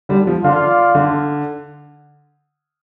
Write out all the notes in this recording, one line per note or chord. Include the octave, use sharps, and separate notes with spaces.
D3 G3
F3
D3 F4 D5 F5
D3